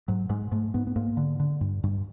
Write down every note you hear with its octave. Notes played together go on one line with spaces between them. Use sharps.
G#2 F#3
G#2 G#3
G#2 A3
G#2 B3
B3
G#2 A#3
D3
D3
G2
G2